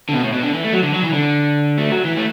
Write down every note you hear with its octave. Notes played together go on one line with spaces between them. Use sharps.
D3
B2
A2
B2
D3
E3
A3
F#3
D3
F#3
E3
D3
A3
F#3
E3
A3